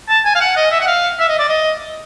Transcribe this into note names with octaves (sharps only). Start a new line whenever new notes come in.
A5
G#5
F5
F#5
D#5
E5
F#5
F5
E5
D#5
D5
D#5